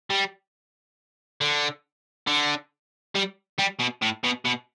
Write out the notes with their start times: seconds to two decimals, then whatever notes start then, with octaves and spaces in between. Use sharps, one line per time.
0.10 G3
1.41 D3
2.27 D3
3.15 G3
3.58 G3
3.79 B2
4.02 A2
4.24 B2
4.45 B2